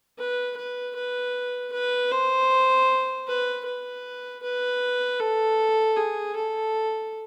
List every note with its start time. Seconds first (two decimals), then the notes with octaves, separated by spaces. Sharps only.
0.18 B4
0.56 B4
0.95 B4
1.72 B4
2.11 C5
3.27 B4
3.66 B4
4.42 B4
5.20 A4
5.96 G#4
6.35 A4